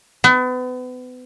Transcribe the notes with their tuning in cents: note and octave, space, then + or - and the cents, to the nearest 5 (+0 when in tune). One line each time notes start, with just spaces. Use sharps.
B3 +35